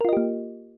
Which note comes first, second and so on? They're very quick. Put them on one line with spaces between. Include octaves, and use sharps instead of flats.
A#4 F4 D#5 G4 A#3